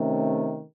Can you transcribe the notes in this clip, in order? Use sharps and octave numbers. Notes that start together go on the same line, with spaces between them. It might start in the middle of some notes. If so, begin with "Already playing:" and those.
Already playing: C3 D#3 A3 C#4